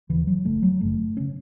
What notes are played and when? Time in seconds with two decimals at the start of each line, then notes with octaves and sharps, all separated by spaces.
0.09 E1 D#2 C#3 E3
0.27 F#3
0.45 F#1 F#2 C#3 A3
0.63 F#3
0.81 F#1 F#2 C#3 A3
1.17 C#3 C#4